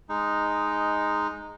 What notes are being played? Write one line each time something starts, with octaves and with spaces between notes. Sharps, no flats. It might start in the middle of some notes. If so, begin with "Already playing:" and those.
G#3 D#4